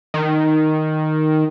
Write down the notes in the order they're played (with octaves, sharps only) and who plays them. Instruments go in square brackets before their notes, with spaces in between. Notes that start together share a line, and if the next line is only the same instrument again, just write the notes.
[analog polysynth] D#3